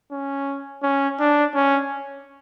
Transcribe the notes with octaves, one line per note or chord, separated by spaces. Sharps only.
C#4
C#4
D4
C#4